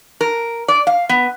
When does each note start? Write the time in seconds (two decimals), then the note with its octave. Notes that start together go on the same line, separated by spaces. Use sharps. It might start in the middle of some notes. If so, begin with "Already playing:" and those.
0.21 A#4
0.68 D5
0.87 F5
1.09 B3